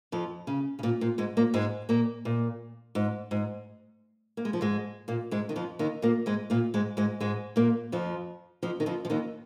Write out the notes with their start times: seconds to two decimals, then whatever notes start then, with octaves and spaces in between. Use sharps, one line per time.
0.12 F2 F3
0.47 C#3
0.79 C#3
0.83 A#2
1.01 A#2
1.18 G#2 G#3
1.37 A#2 A#3
1.54 G#2 G#3
1.89 A#2 A#3
2.25 A#2
2.95 G#2
3.31 G#2
4.37 A#3
4.45 G#3
4.53 F3
4.61 G#2 G#3
5.08 A#2 A#3
5.31 G#2 G#3
5.49 D#3
5.56 F2 F3
5.79 D#2 D#3
6.02 A#2 A#3
6.26 G#2 G#3
6.50 A#2 A#3
6.74 G#2 G#3
6.97 G#2 G#3
7.20 G#2 G#3
7.56 A#2 A#3
7.92 F2 F3
8.63 F2 F3
8.80 D#3
8.86 F2 F3
9.05 F3
9.10 D#2 D#3